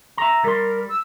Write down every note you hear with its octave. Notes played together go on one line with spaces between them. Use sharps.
E5 A#5
G3 A#4 C6
E6